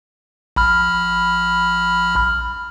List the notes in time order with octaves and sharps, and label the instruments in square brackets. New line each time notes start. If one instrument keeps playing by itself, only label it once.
[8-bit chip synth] A#1 B5 F6